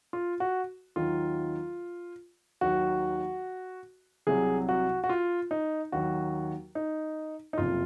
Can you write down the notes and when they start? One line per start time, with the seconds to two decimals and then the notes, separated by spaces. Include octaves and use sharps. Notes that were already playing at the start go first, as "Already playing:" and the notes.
0.13 F4
0.40 F#4
0.96 D#2 D#3 F#3 F4
2.61 D#2 D#3 F#3 F#4
4.27 C2 C3 F#3 G#4
4.69 F#4
5.04 F#4
5.09 F4
5.51 D#4
5.92 D#2 D#3 F#3 F#4
6.75 D#4
7.53 D#4
7.58 F#1 F2 C3 F4